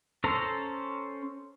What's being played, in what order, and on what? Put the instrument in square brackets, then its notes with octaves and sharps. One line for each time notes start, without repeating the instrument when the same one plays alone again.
[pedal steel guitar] C#4 A4 C5 A#5